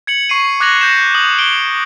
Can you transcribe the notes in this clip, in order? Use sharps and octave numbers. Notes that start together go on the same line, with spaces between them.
G#6 C#7 F#7
C#6 C7 D#7
D6 F#6 G#6 A#6 F7 F#7
G6 A#6 C#7 E7
D#6 F#7
D7 G7